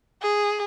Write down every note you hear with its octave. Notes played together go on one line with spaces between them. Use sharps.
G#4